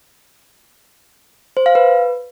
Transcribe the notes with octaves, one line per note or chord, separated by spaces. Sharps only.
C5
F5
B4